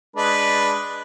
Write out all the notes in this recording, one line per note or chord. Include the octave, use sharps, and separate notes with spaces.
G#3 D4 B4